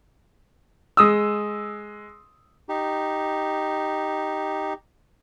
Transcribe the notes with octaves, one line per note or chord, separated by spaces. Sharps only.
G#3 D#6 E6
D#4 G4